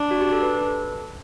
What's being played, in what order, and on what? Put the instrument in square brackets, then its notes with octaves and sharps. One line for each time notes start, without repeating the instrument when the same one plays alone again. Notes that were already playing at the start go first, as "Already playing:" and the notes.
Already playing: [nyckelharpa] D4
[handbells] F#4
G4
A4
B4
B4
A4